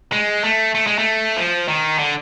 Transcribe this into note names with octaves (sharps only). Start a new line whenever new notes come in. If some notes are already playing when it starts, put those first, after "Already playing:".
G#3
A3
A3
G#3
A3
F3
D#3
D3